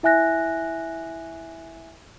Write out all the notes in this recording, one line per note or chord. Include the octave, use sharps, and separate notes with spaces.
E4 E5 G#5 F#6 A#6